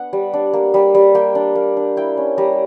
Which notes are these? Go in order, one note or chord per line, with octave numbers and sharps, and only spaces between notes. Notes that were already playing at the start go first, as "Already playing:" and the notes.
Already playing: B3 D4 F#5
G3
D4
A#3
G3
G3
A#3 G5
D4
A#3
D4
E4 G5
C#4
G3 A#5